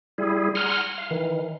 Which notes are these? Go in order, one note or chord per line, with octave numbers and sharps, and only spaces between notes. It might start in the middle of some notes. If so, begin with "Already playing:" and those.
G3 E4 G#4
F#5 G#5 A#5 C6 F6
F5
D#3 E3